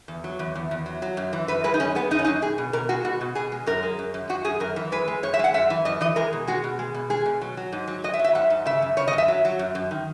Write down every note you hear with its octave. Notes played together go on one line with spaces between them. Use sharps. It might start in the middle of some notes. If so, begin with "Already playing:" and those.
E2
F#3
E2
E2
E2
F#3
F#3
F#2
E3
F#2 B4
G#3 B4
D#4
F#2 C#4
G#3 B3
F#2 D#4
C#4
F#2 D#4
B2 G#4
B2
B2 A#4
G#3 F#4
B2 F#4
B2
B2 G#4
G#3
F#2 A#4
G#3
F#2
F#2
F#2 F#4
F#2 G#4
F#2 A#4
E3
G#3 B4
G#3
F#2 C#5
E5
G#3 F#5
F#2 E5
E3
F#2 D#5
E3 D#5
G#3 A#4
B2
G#3 F#4
B2
G#3
B2
G#3 G#4
B2
F#3
F#3
G#2
F#3
F#3 D#5
E5
F#3
E5
G#2 F#5
G#2
C#3 E5
F#2
C#3 C#5
D#5
F#2
E5
F#3
F#3
F#2
F#2
D#3